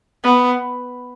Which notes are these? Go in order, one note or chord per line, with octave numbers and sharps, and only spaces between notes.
B3